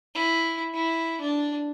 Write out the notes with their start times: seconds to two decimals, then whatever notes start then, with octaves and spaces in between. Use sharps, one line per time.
0.15 E4
0.74 E4
1.21 D4